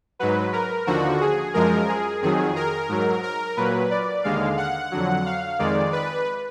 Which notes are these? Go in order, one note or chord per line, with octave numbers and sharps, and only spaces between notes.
G#2 F#3 B4
A#4
D#2 D3 F3 F#4
G#4
F#2 F3 G#3 A#4
G#4
F2 D#3 F#3 G#4
A#4
G#2 F#3
A#4
A#2 F#3 B4
D5
D#2 D3 G#3 F5
F#5
F2 D3 F#3
F5
F2 D#3 G#3 D5
B4